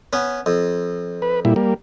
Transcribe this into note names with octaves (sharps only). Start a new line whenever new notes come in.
B3 C#4
F2
B4
A#2 G3 E4
G3 A#3